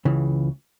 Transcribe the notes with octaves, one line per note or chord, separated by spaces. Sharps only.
C#2 C#3 E3